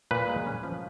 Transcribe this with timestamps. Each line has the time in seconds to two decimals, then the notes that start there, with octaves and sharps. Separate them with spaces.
0.11 A#2 B4
0.29 G#3
0.47 C#4
0.63 F3